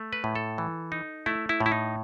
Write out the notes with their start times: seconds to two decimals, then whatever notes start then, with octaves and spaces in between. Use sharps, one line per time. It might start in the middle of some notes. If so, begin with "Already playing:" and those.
Already playing: A3
0.13 B4
0.24 A2
0.35 A4
0.58 E3
0.92 D#4
1.26 A3 E4
1.49 E4
1.60 A2
1.66 E4
1.72 D#4